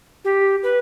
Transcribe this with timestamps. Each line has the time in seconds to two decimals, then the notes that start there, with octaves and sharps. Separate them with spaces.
0.25 G4
0.63 B4